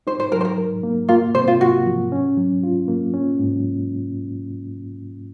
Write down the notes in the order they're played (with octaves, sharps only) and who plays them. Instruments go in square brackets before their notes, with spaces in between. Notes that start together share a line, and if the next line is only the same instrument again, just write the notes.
[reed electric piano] D#4 [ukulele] C5
[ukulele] C5
[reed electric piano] F#3 [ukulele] A#4
[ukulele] C5
A#4
[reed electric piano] A#4
A#3
[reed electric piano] A#3 [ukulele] F4
[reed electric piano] C3 [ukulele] C5
[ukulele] F4
[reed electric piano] F4 [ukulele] F#4
[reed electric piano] F3
C#4
F#3
F4
A#3
C#4
G#2